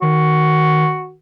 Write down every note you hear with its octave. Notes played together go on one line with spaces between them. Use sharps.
D#3 F#4